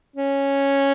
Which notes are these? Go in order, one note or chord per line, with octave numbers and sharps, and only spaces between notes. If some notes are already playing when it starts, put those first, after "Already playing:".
C#4